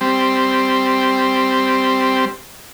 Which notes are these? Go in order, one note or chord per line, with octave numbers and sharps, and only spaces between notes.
G3 C4